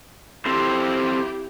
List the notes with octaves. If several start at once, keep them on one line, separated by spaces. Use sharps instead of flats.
C4 E4 G4 A4 C5